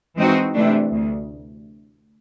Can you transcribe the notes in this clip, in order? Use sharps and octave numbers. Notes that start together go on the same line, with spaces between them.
E3 G#3 C4 D#4 F#4
C3 E3 A3 D4
D2